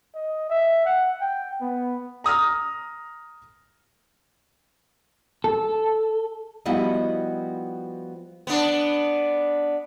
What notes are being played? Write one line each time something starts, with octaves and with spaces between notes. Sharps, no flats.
D#5
E5
F#5
G5
B3
A#5 D#6 F6 A#6
A4
F3 G3 B3 E4 F#4 D#5
B3 D4